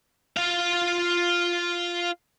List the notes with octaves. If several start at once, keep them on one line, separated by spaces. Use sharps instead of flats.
F4 F5